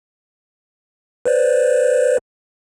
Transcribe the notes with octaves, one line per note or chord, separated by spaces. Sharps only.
B4 C5 D5